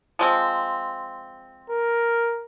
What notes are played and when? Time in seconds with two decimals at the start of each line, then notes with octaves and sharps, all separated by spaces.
0.19 F3 G#3 C4
1.70 A#4